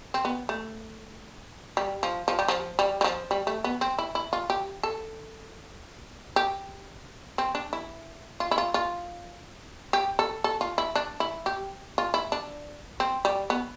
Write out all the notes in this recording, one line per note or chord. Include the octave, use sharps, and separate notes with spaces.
C4
B3
A3
G3
F3
F3
G3
F3
G3
G3
F3
G3
A3
B3
C4
E4
E4
F4
G4
A4
G4
C4
D4
E4
F4
E4
F4
F4
G4
A4
A4
F4
E4
D4
E4
G4
F4
E4
D4
C4
G3
B3